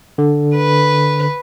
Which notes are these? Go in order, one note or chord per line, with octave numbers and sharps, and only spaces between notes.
D3
B4